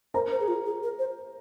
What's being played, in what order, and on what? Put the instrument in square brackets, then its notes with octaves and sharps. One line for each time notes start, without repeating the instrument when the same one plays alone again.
[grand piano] A#4 A#5 [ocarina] C5
[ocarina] C5
G#4
F4
G#4
A#4
C5